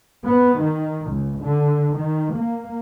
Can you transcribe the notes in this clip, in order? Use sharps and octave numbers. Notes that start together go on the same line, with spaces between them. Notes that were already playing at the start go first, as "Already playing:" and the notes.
B3
D#3
C#2
D3
D#3
A#3